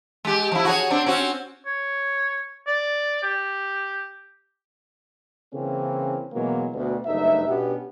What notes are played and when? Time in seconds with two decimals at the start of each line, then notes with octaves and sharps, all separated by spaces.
0.25 G#3 G4
0.52 F3 E4
0.65 F#4 G#4 C#5
0.90 C4 D4
1.06 C4 C#4 F#4
1.66 C#5
2.67 D5
3.23 G4
5.53 C#3 E3 A#3 C4 C#4
6.33 B2 E3 F#3 G#3 A#3
6.74 D2 B2
7.06 F#1 G2 A3 D#4 E5
7.48 B2 B3 C#4 D4 F#4 G4